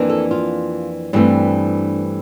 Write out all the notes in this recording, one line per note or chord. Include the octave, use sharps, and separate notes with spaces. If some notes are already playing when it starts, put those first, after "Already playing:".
Already playing: F2 E3 A#3 D4
A4
F4
G2 E3 A3 C4 D4